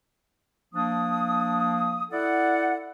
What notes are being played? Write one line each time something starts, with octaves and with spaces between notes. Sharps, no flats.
F3 A#3 D4 D#6
E4 A4 D5 F#5